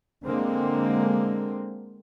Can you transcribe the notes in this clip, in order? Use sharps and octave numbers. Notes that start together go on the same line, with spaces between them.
D3 G#3 A#3 C4